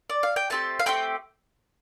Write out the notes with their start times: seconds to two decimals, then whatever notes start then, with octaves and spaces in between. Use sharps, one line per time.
0.10 D5
0.23 F5
0.36 G5
0.50 A3 C4 G4 A5
0.79 F5
0.86 A3 C4 G4 G5